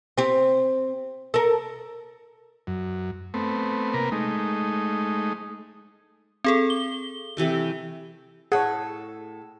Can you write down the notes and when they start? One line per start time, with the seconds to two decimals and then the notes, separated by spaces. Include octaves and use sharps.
0.18 C4 G4
1.34 A4 A#4
2.67 F#2
3.34 A3 B3 C4
3.94 C3 A#3 A#4 B4
4.12 G#3 A3 D#4
6.44 C4 G#4 A4
6.70 G7
7.37 C3 E3 A3
8.52 A2 G#4 A4 C#5 F#5